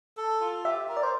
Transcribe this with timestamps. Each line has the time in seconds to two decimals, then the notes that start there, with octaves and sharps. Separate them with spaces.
0.17 A4
0.41 F4
0.64 G4 E5
0.88 A#4
0.97 D5
1.03 C5